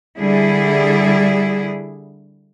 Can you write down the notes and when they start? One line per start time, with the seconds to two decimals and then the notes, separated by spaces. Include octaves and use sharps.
0.19 D3 G3 E4 G#4